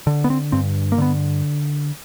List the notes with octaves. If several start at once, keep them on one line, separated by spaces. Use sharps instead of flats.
D3
B3
C4
G2 C4
A#3
D3 B3